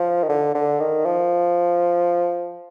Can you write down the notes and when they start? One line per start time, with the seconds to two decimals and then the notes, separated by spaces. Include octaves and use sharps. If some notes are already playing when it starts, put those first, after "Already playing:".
Already playing: F3
0.23 D#3
0.29 D3
0.55 D3
0.80 D#3
1.05 F3